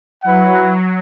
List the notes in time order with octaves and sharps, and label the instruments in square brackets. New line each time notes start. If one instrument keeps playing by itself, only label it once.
[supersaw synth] F#3 [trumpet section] E4 B4 F#5